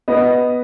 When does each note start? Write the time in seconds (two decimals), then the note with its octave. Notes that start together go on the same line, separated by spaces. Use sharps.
0.08 B3 D#5